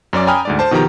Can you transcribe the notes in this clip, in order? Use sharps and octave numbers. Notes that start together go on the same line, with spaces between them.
F#2 C#4 D5 D6
G5 G#5 A#5 B5 D#6 F6
D2 G#2 D5
C5 A5
B2 D#3 F3 G4 A#5